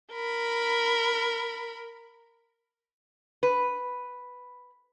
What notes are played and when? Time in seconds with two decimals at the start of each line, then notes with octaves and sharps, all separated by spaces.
0.13 A#4 B5
3.43 B4